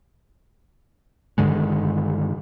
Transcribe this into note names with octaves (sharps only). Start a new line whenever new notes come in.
G2 D3 D#3 G#3